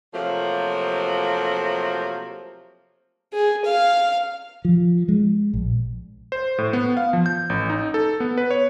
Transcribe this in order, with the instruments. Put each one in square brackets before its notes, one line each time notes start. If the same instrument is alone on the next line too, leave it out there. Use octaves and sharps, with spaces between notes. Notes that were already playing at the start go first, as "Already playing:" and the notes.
[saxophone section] C3 F3 F#3 A3 A#3
[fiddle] G#4
F5
[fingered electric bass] F3
G#3
A#1
[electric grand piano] C5
A2
B3
F5
F3
G6
A1
D#4
A4
B3
B4
C#5